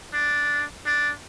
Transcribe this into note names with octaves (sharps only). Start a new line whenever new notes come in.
D4
D4